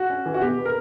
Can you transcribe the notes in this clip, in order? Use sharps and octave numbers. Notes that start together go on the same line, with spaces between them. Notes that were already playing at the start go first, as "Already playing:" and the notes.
Already playing: F#4
C#4
E3
F#4
B2 G4
B3
A#4